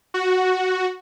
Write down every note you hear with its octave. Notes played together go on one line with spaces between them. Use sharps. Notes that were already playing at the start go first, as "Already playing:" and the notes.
F#4